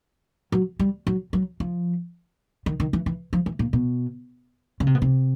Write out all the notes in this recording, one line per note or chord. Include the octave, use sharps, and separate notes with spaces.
F#3
G3
F#3
F#3
F3
D#3
D#3
E3
E3
F3
E3
A#2
B2
C#3
C3
B2
C3